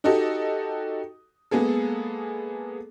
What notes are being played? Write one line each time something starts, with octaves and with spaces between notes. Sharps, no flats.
D#4 F#4 G4 A4 D#5
G#3 A#3 B3 G#4 A4